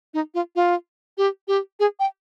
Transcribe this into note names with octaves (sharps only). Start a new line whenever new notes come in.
D#4
F4
F4
G4
G4
G#4
G5